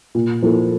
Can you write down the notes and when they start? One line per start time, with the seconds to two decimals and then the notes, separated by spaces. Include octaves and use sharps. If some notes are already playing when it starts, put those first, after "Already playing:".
0.15 A#2
0.42 F3 A#3 E4 A4